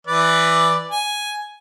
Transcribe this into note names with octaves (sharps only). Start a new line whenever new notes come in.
E3 B4 D5
G#5